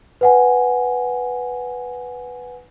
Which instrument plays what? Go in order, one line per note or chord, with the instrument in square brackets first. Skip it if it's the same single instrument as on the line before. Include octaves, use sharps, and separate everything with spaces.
[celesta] B4 F#5 G#5